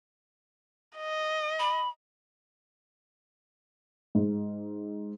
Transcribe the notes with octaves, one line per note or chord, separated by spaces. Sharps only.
D#5
B5
G#2